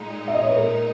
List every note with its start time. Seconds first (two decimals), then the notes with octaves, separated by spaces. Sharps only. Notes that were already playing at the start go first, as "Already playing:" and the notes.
Already playing: A#2 G#3 D#4
0.28 E5
0.35 D#5
0.42 C#5
0.49 B4
0.56 A#4